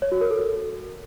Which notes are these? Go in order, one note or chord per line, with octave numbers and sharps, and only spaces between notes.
C#5
F#4
A#4
A4